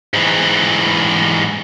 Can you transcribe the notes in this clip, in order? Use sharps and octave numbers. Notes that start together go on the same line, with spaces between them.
G#2 E3